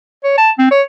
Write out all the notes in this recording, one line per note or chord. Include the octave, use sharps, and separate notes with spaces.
C#5
A5
C4
C#5